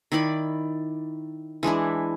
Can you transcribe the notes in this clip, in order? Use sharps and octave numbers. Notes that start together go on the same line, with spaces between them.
D#3 E4 D5 B5
E3 G#3 D4 E4